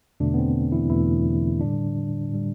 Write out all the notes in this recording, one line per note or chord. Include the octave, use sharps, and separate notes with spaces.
E2 B2 D3 A3 D4
B3
C4
E3 E4
E2 B2 E3 A3 E4
A2 D3 G3 D4
A2 G3